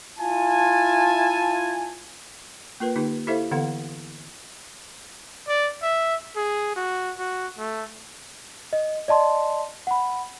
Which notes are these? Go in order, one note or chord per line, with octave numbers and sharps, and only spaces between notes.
E4 F4 G#5 A5
A#3 F4 A#4 B4
D3 A#3 D#4 G4
E4 G4 A4 C5 E5 F5
D3 E3 B3 A4 F5 F#5
D5
E5
G#4
F#4
F#4
A3
D#5
D5 D#5 A5 C6
F#5 B5